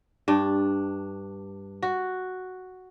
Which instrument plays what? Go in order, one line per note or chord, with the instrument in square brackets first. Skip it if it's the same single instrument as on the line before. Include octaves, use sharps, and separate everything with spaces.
[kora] G2 D4
F#4